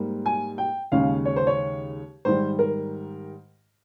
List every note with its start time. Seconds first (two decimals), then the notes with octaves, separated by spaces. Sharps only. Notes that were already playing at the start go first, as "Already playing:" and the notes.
Already playing: G#2 G3 A#3
0.26 G#5
0.58 G5
0.92 D#2 C#3 G#3 C#4 F5
1.25 C#5
1.36 C5
1.47 C#5
2.25 G#2 D#3 G3 C5
2.59 A#4